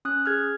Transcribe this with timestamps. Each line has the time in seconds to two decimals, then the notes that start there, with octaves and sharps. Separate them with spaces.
0.05 C#4 D#6 F#6
0.26 G#4 F6 G#6